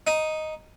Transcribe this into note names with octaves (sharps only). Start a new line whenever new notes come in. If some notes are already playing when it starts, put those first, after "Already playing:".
D#4